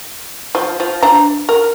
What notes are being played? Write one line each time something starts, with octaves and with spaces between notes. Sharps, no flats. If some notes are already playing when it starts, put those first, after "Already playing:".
F3
F3
D4 A#5
A#4